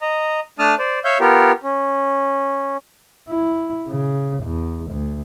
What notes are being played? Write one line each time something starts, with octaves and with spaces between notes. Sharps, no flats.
D#5 A#5
A3 D4 A5 D#6 F6
C5 D5
C#5 E5 F5 G6
B3 F4 G4 A#4
C#4
E4
C#3
E2
D2